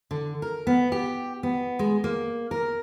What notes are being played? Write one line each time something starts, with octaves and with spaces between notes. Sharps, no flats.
D3
A#4
B3
G4
B3
G#3
A#3
A#4